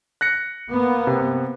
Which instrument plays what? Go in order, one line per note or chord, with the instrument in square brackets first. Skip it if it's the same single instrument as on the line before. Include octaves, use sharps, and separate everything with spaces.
[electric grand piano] F#6 A#6 C#7
[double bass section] A#3 B3
[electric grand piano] C3